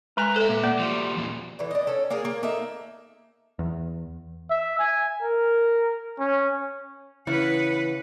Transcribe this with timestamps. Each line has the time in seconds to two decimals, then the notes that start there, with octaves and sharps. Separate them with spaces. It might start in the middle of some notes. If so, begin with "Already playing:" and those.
0.17 G#3 B4 G#5 A#5
0.36 A4 C5 E5
0.49 A#2
0.63 A#3 D5
0.79 F3 G3
1.14 E2 A#2
1.59 D3 E3
1.71 D4 D#5
1.87 C#4 A4
2.10 A#3 D4 G#4 A#4
2.25 A#3
2.43 A#3 D#4 A4 E5
3.59 E2
4.50 E5
4.79 G#5
5.22 A#4
6.19 C#4
7.27 C#3 E3 B3 E4 B4 F#5